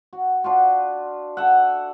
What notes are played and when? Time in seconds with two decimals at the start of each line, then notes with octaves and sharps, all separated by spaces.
0.13 F#4
0.44 D4 F4 F#4
1.37 A4 E5 F#5